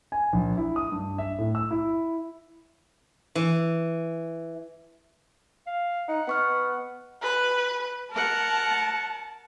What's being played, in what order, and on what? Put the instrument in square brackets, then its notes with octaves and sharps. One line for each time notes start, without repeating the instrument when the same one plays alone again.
[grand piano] G#5
A#1
E4
D#6
G2
E5
A2
E6
E4
[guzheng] E3
[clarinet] F5
[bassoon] D#4 [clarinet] F#5
[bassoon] B3 [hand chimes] D#5 C#6 F6
[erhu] B4
[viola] A#4 F#5 [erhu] A5